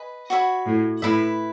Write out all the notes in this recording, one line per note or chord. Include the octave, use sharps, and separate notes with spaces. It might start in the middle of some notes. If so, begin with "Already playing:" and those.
Already playing: B4 D#5 G#5
F#4 C#5 E5 B5
A2
A2 E4 B4 E5